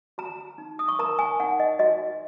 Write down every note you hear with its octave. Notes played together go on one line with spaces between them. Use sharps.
F#4 A#5
D#4
D#6
C#6
A#4 A#5
G#5
D#4 F#5
D#5
F#4 D#5